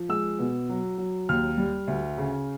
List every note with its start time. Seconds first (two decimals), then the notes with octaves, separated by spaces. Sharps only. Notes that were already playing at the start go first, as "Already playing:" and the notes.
Already playing: F3
0.09 G#3 E6
0.39 B2
0.69 F#3
0.98 F#3
1.29 D#2 F6
1.58 G3
1.88 D2
2.18 C#3